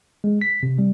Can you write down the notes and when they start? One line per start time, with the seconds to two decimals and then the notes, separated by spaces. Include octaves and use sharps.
0.24 G#3
0.41 B6
0.63 C3
0.79 G3